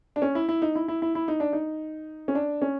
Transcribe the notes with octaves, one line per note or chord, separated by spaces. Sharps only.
D4
C#4
E4
E4
D#4
E4
E4
E4
E4
D#4
D4
D#4
C#4
D4
C#4